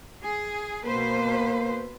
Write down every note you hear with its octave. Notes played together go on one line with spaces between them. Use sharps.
G#4
B2 A#3 B4 C5